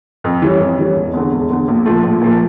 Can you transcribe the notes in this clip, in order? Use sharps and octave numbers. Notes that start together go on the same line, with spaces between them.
F2
E3 G3 C#4
F2
E3 G3 C#4
E1
E2 D3
E1
E2 D3
A#1
A#2 F3 A3
A#1
A#2 F3 A3